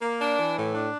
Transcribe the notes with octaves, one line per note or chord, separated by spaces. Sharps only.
A#3
D4
E3
A2
D4